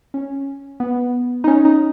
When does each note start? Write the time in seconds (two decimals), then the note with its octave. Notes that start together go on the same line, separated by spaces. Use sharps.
0.14 C#4
0.80 B3
1.44 D#4
1.48 C#4
1.65 D#4